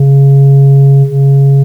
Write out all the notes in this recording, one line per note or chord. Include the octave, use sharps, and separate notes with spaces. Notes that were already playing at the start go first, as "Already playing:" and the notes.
Already playing: C#3
C#3